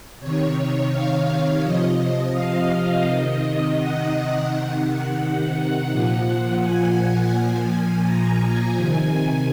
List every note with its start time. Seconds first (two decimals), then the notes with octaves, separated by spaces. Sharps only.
0.20 C3 D#3 C#5
0.91 F5
1.27 C#5
1.63 C3 F3 D#5
2.34 F5
3.05 C3 D#3 D#5
3.77 F#5
4.48 C3 D#3
5.91 A#2 F3
6.62 G#5
7.33 A#2 F3 G#5
8.05 A#5
8.76 C3 D#3 G#5